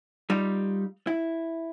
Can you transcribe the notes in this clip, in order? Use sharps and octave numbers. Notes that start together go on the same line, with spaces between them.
G3 D#4 F4
E4